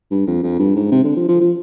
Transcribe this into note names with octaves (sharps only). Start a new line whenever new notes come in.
G2
F2
F2
G2
G#2
C3
D3
F3
F3
F3